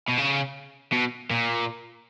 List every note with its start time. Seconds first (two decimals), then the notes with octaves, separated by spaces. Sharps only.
0.09 B2
0.18 C#3
0.92 B2
1.30 A#2